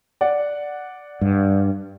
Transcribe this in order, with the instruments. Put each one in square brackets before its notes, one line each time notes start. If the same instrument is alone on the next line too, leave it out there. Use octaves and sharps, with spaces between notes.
[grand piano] D5 F#5
[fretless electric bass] G2